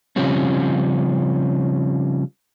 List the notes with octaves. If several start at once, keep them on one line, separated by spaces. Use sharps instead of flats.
C#3 F3 G3 C4 C#4